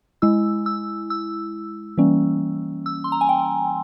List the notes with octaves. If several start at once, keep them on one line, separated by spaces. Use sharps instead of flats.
G#3 E4 E6
E6
E6
E3 G3 A#3 C#4
E6
C6
A#5
G#5
G5